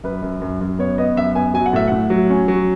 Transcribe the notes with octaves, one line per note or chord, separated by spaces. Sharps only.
F#2 B4
F#2
F#2
F#2
B3 C#5
B3 D#5
F#2 E5
B3 G#5
F#3 G#5
F#5
A2 E5
A2 F#5
F#3
C#4
F#3